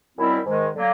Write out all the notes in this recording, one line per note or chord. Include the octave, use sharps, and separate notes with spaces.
F#2 D#3 G3 C4 E4
G#2 D#3 G#3
D3 F#3 A#3